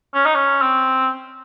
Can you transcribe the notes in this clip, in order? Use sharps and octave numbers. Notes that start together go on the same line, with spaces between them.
C#4
D#4
C#4
C4